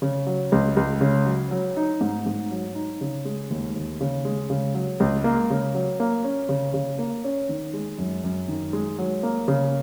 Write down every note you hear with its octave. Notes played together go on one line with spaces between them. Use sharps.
C#3
F#3
C#2
C#2
C#3
F#3
F#3
D#4
G#2
G#2
F#3
D#4
C#3
G#3
D#2
D#2
C#3
G#3
C#3
F#3
C#2
A#3
C#3
F#3
A#3
C#4
C#3
C#3
A#3
C#4
D#3
G#3
F#2
F#2
D#3
G#3
F#3
A#3
C#3